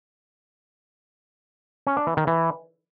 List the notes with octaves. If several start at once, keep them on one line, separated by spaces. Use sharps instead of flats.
C#4
D4
E3
D#3
E3